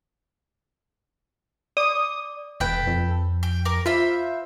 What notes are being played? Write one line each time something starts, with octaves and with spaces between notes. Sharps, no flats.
D5 D6 D#6
E1 A4 B4 G5
F2
G5
A#4 D6
F4 C5 E5 B5